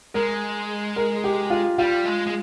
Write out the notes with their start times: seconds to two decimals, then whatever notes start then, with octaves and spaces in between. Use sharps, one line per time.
0.14 G#3 A#4
0.96 A#4
1.24 G4
1.50 F4
1.78 G3 F4
2.05 G#3
2.26 G#3